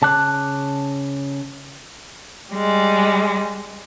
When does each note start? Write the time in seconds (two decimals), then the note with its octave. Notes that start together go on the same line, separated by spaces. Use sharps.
0.02 C#3 A5 D6 F#6
2.52 G3 G#3